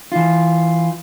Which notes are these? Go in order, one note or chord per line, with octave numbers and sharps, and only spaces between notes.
E3 F4